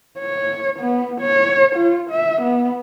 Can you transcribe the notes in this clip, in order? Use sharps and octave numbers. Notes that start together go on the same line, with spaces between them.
C#5
B3
C#5
F4
E5
B3